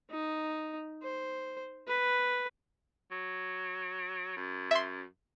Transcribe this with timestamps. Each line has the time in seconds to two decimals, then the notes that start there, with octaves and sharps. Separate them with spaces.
0.11 D#4
1.02 C5
1.87 B4
3.11 F#3
4.37 F#2
4.71 E5 C6